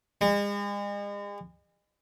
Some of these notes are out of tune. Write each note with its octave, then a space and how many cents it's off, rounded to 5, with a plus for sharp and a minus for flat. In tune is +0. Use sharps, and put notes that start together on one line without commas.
G#3 -40